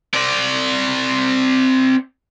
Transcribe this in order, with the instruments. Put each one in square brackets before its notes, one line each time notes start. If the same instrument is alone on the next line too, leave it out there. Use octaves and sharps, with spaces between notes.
[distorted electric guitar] C4 D5